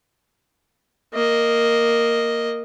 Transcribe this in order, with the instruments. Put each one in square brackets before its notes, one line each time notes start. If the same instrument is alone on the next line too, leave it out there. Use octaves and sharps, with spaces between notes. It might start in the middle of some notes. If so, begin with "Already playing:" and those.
[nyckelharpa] A#3 D#5